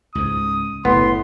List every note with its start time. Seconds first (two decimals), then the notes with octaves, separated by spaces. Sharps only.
0.15 C#2 G#2 D#6
0.85 F#1 F#2 A2 D3 B3 C6